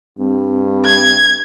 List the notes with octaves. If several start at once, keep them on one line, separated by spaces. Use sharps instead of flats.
G2 C4
G#6